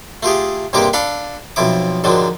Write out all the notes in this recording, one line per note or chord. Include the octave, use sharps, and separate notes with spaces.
A3 F4 G4 G#4
G2 C3 G#3 A#3 G4 D6
D4 A4 F5 B5
B1 F2 F3 E4 D6
G#2 D3 D#3 F3 F#3